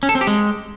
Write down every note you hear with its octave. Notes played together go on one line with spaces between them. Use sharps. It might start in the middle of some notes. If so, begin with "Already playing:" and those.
C#4
A4
C4
G4
G#3